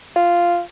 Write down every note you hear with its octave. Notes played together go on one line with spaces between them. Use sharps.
F4